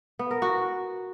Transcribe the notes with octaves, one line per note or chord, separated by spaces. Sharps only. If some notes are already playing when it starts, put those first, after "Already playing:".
B3
A#4
F#4